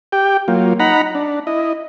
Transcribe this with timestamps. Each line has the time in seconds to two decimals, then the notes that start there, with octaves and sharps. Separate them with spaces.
0.12 G4 G5
0.48 F#3 A#3 F4
0.80 D#4 F#5 A#5 B5
1.15 D4
1.47 E4 D#5